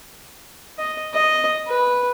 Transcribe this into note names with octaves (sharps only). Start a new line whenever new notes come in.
D#5
D#5
B4